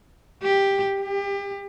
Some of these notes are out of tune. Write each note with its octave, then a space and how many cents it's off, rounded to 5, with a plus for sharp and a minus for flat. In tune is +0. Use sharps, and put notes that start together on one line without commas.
G4 +5
G4 +30